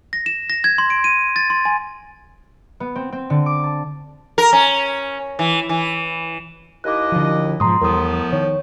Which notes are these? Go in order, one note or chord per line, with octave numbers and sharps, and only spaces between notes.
A#6
E7
A#6
G#6
C6
D7
D#7
A6
C6
G#5
B3
C4
C4
D3
D6
A5
A#4
C#4
E3
E3
D#2 E4 D#5 D6 F#6
D3 F3
G#2 B2 F3 A#5 C6 D#6
E2 A2 F3 G3 B3 A#4 D#6
D#3 C#5